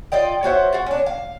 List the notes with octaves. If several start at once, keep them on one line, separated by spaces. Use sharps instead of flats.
F4 D5 D#5 G5
C#4 F#4 C5 E5
F4 F#4
C#4 D4
F5